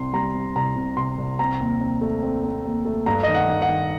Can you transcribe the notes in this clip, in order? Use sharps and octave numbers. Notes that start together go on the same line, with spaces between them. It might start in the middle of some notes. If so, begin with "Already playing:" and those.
Already playing: C2 C3 C6
G3 A#5
C3
C2 A#5
C3
C3 C6
C2
C4 A#5
D#2
C4
A3
C4
C4
D#2
A3
G2 A#5
D#3 D#5
F#5
D#3
F#5
D#3